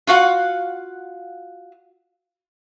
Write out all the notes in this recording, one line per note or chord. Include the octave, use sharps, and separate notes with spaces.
F4 F#4 F5 F#5